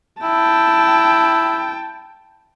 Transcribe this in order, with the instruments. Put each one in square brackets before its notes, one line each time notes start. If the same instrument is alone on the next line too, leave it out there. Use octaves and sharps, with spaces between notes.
[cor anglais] E4 [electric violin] G5 A5